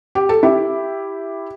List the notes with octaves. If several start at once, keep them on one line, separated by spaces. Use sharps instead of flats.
G4
A4
E4 G4